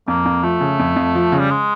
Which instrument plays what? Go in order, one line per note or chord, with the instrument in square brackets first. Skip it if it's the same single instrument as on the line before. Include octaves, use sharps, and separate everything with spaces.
[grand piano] F2 [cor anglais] A#3
[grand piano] F2
[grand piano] F3 [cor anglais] A3
[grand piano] C#3
F2
F2
F3
C#3
[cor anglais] G3
G#3